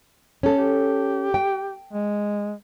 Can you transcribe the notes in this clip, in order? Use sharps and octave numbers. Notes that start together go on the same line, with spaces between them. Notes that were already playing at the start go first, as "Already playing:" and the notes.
C#4 A4
G4
G5
G#3